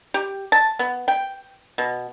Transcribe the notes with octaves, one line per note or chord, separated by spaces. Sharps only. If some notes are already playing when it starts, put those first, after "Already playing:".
G4
A5
B3
G5
B2